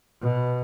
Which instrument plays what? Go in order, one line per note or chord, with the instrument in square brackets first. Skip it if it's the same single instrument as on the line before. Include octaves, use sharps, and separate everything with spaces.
[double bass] B2